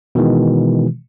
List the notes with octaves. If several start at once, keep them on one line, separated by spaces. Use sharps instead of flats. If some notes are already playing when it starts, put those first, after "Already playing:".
B2 D#3 E3 G#3